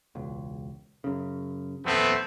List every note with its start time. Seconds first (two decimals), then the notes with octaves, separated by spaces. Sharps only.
0.15 E1 C#2
1.04 F#2 C#3
1.85 D#1 F2 A3 B3 C4